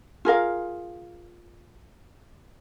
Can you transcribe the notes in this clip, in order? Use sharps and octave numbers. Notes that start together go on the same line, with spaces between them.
F4 G#4 A#4 F5